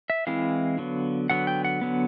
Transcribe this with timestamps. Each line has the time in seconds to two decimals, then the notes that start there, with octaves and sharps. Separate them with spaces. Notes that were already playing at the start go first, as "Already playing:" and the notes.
0.10 E5
0.27 E3 G#3 C4 E4 F5
0.78 D3 F#3 B3
1.30 D3 F#3 B3 F#5
1.47 G5
1.65 F#5
1.81 D3 F#3 B3